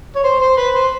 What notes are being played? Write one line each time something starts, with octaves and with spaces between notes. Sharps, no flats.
C#5
C5
C5
B4
C5